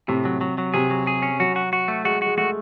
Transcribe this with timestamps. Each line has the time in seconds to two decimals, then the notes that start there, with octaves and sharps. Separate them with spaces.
0.08 A2 C3
0.25 F#3
0.41 F#3
0.58 F#3
0.74 C3 G#4
0.90 F#3
1.07 G#4
1.22 C#4
1.39 F#3 F#4
1.56 F#4
1.73 F#4
1.88 A3
2.05 G#3 F#4
2.22 G#3 F#4
2.37 A3 F#4